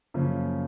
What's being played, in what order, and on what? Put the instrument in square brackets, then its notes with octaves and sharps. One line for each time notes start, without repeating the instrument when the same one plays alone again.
[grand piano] F#2 C#3 F3 A#3 C#4